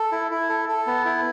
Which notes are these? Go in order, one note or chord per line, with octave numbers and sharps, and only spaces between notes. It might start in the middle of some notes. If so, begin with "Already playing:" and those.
Already playing: A4
E4
E4
A4
A4
B3
E4